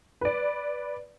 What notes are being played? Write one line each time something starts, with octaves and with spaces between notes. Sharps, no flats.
B4 D5